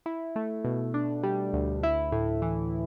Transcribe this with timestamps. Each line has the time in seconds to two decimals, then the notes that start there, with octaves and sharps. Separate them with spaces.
0.06 E4
0.36 A3
0.65 B2
0.94 D4
1.23 G3
1.53 D2
1.83 E4
2.12 A2
2.42 E3